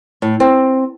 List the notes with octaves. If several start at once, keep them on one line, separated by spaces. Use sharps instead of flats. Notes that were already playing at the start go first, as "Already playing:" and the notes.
A2
C4